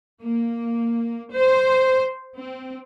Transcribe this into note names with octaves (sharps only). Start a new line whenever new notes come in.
A#3
C5
C4